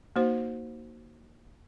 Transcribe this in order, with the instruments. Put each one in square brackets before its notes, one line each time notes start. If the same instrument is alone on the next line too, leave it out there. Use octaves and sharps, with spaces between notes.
[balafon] A#3 D#4 F#4 C5